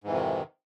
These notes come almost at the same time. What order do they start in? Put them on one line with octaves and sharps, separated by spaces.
G#2 E3 F2 C3 D#3